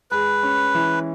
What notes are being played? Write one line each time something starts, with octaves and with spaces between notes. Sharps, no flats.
G#3 B4
C#4
E3